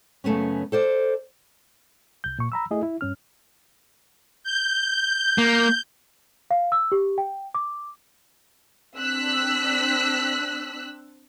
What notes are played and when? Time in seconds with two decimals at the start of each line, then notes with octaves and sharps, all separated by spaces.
0.24 F#2 C#3 A3 B3 C#4
0.72 A4 C5 D5
2.24 C2 G6
2.39 A#2 C#6
2.52 A#5 B5 E6
2.71 A3 E4 G#4 D#5
2.83 E4
3.01 G2 C#4 F6
4.44 G6
5.38 A#3
6.51 F5
6.72 E6
6.92 G4
7.18 G5
7.55 D6
8.97 C4 D4 E6 F#6 B6